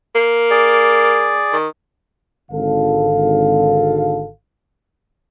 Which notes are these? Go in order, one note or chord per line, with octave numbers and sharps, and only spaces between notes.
A#3
G#4 D5
D#3
G#1 D3 A4 F5